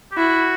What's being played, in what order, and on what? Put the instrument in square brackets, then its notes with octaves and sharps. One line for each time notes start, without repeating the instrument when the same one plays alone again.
[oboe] G4
[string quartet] E4 [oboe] F#4